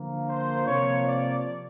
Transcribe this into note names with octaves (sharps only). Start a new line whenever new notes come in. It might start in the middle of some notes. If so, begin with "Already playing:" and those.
Already playing: D3 F3 A#3
C5
C3 F3 A#3 C#5
D5